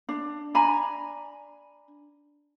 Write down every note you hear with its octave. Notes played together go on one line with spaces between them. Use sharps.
D4
D4 G#5 A#5 B5